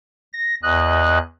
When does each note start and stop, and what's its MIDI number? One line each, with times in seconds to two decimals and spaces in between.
0.33 0.55 94
0.63 1.18 40
0.63 1.18 75
0.63 1.18 90